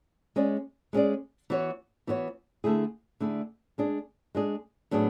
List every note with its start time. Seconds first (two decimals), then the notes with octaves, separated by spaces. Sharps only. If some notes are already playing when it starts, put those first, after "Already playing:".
0.36 G#3 C#4 G#4 D5
0.93 G#3 C#4 G#4 D5
1.50 E3 B3 F#4 C#5
2.07 E3 B3 F#4 C#5
2.64 D3 A3 E4 G#4
3.20 D3 A3 E4 G#4
3.78 G#3 D4 G#4
4.35 G#3 D4 G#4
4.91 A2 F#3 B3 D4 G#4